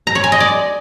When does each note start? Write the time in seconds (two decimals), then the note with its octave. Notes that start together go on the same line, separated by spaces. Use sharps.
0.07 A#5
0.15 C#5
0.24 G#5
0.32 D#5
0.40 D5